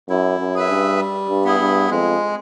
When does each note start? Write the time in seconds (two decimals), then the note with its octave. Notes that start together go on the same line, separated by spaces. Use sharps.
0.09 F#2 E4
0.40 F#2
0.55 G#4 B4 E5
0.69 G2
0.99 G3
1.29 G2
1.45 B3 E4 G#4
1.60 G2
1.90 F2 G#3